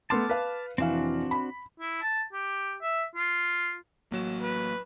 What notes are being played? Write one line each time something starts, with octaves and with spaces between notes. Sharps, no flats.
A3 B3 A5 C6 D6 F6
B4 F5
F1 E3 C4 D4 F#4 F5
B5
E4
A5
G4
E5
F4
A1 F#3 A#3 E7
B4